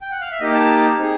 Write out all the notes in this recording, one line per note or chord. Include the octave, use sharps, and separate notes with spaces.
G5
F#5
F5
E5
A#3 D#4 G4 D#5
A5
C4 D#4 G#4